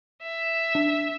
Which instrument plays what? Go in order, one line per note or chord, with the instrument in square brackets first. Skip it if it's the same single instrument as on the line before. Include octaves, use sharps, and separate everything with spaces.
[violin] E5
[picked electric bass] D4